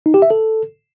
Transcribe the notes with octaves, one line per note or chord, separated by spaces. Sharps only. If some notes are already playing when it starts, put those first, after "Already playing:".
D#4
G4
E5
A4